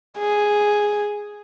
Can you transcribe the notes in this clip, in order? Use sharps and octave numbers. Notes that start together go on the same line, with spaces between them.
G#4